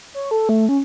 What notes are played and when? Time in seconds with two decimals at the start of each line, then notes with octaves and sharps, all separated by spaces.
0.14 C#5
0.31 A4
0.49 A3
0.69 C#4